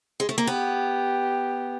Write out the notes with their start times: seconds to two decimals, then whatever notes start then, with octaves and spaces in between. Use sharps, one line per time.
0.20 G#3
0.29 A3
0.38 A#3
0.47 B3 G4